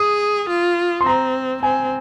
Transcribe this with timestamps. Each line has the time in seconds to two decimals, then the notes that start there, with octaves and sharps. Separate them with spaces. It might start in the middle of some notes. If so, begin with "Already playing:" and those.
Already playing: G#4 D#6
0.50 F4
1.01 C6
1.06 C4 A#5
1.63 C4 G#5